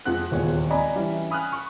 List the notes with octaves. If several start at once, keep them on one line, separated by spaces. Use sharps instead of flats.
F2 G#3 C4 F#5 F#6
D#1 G#1 E2 A#2 G#3 C#5
C4 D5 D#5 G#5 A#5 B5
E3 G3 C#4
G#5 B5 D#6 F6 F#6
C#6